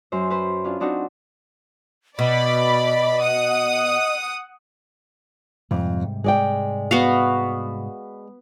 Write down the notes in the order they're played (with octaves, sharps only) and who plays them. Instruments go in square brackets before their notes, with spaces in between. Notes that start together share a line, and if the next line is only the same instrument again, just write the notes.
[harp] F#2 C5
B4 C5
C#4 D4 F4
C4 D4 D#4 F#4
[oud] B2 [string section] D5 B5 [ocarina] D#5
[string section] F#5 D#6
[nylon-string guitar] F2 [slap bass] G#2 C3 G3
[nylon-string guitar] G#3 D5 G5
[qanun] B3 F#4 F5